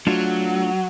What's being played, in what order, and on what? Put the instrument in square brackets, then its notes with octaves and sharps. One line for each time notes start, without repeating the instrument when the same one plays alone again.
[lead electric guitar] F#3 [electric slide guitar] A3 D4 F4